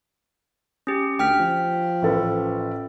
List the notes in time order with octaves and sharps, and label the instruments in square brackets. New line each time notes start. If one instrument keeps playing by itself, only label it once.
[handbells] C#4 G4
[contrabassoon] D2 [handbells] G5 F6 B6
[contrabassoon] F3
[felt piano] A1 A4 B4